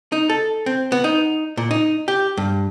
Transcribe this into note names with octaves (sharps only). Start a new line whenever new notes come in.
D#4
A4
C4
B3
D#4
A#2
D#4
G4
G2